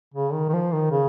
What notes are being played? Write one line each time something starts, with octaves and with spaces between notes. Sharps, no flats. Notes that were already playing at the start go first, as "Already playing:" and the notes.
C#3
D#3
D#3
F3
D#3
C#3